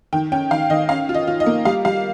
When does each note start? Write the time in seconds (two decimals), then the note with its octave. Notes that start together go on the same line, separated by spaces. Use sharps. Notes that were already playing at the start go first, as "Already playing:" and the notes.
0.13 D#3 G5
0.32 C#4 G5
0.51 D#3 F5
0.70 D#3 D#5
0.89 C#4 F5
1.09 F4
1.15 D#5
1.27 F4
1.40 D#5
1.46 A#3
1.65 G3 F5
1.85 G3 F5